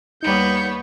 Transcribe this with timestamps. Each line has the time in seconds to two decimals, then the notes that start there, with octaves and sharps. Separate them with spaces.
0.23 D#2 G3 B3 D#4 C#5 G6 C#7